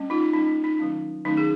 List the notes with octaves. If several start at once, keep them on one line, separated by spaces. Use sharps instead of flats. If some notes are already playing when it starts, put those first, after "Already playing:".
Already playing: G3 A#3 C#4
D#4 F4
G3 A#3 C#4 D#4
D#4
D#3 F#3 A3 C#4
D#3 F#3 A3 C#4 D#4
G#4